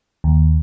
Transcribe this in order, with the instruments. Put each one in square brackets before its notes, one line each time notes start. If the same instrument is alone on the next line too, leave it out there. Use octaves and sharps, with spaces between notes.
[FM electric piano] D#2